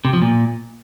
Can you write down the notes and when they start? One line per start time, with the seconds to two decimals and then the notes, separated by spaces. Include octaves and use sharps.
0.05 C3
0.13 F3
0.22 A#2